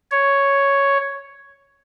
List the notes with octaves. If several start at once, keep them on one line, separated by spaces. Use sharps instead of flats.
C#5